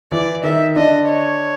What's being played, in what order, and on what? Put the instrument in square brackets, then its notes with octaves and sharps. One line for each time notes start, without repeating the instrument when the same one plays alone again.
[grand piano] E3 E4 [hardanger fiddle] D5
[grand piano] D#3 D#4 [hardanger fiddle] E5
[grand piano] D3 D4 [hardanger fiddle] D#5
[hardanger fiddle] C#5